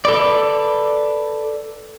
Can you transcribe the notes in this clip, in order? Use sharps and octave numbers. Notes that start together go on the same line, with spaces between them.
A4 B4 D5